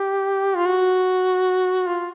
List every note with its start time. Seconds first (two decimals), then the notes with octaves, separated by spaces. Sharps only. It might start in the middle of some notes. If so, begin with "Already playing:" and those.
Already playing: G4
0.56 F4
0.66 F#4
1.87 F4